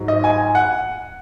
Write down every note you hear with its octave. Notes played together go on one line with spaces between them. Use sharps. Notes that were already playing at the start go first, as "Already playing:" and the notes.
Already playing: G#2 F#3
D#5
G#5
F#5